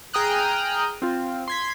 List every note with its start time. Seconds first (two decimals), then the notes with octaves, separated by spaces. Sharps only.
0.13 G#4 G5 A#5 D#6 F6 F#6
1.02 C4 F4
1.48 C6 G#6 B6